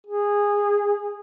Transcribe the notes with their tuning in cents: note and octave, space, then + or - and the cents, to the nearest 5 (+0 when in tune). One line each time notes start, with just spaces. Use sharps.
G#4 -20